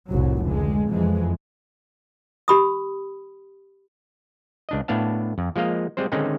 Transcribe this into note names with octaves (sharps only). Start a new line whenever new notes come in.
F1 C2 A2 F#3
C#2 D3 G#3
F2 E3 G#3
G4 B5 D#6
C#2 D4 D#5
A2 A3 B3 D4 F5 A5
F2
F3 G#3 A#3 D#5 F5
G3 G#3 C4 C5
D3 D#3 G#3 C4 C#4 D#4